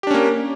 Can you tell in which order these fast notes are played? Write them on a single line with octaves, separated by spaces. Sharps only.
G4 D4 C#4 A#3